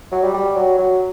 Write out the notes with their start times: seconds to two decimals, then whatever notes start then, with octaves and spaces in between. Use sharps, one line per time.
0.12 F#3
0.23 G3
0.34 G3
0.56 F#3
0.78 F#3